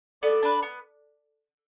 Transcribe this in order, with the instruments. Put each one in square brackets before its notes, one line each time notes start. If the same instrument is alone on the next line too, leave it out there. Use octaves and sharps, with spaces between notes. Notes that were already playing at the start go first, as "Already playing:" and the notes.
[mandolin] B3 [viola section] A4 D5
[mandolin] D4 B4
B3